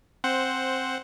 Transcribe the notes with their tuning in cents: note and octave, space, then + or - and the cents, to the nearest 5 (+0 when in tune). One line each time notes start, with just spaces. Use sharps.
C4 +10 C5 +0 F#5 +0